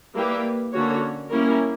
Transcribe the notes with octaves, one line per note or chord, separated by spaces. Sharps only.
G3 A#3 E4 G4 B4
D3 A#3 C#4 F#4 C#5
G3 A#3 C#4 E4 A#4